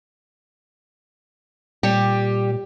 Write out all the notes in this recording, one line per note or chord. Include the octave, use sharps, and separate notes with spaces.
A#2 G3 G4